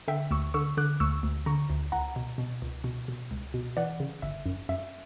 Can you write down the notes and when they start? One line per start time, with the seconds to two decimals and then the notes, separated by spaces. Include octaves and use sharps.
0.08 D3 E5 G5
0.31 D2 C#6 E6
0.54 D3 C#6 E6
0.77 D3 D6 F#6
1.00 D2 C#6 E6
1.23 D2
1.46 D3 A#5 C#6
1.70 D2
1.92 C#2 F#5 A#5
2.16 B2
2.38 B2
2.62 C#2
2.84 B2
3.08 B2
3.31 C#2
3.54 B2
3.77 E3 D5 F#5
4.00 C#3
4.22 G1 E5
4.46 F#2
4.69 F#2 E5